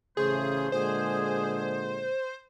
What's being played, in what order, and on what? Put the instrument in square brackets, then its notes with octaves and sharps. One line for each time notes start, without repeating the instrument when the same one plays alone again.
[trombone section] A1 C#3 [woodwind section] A3 C5 [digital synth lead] G#4
[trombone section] A#2 D3 G#3 [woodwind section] G#4 [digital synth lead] C5